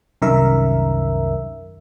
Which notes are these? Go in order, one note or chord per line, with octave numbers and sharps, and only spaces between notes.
C2 F#2 D#3 A#4 E5